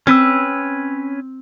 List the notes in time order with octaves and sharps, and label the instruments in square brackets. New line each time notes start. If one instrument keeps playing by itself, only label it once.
[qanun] C4 [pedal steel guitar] C#4 B4 E6